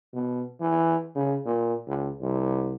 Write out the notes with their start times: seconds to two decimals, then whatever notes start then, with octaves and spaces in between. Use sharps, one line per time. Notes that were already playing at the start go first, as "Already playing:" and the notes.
0.14 B2
0.61 E3
1.16 C#3
1.46 A#2
1.87 C#2
2.21 C2